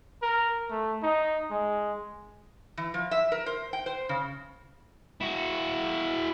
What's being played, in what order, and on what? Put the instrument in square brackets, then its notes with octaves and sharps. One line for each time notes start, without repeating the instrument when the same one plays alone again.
[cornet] A#4
A3
D#4
G#3
[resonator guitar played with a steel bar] E3
F3
E5
A#4
C5
G5
C5
C#3
[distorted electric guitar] E4 F#4